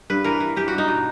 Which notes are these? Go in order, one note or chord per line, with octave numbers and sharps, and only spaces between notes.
G2 B4
E3 A#4
E3
E3 G4
F#4
G2
D#4
B2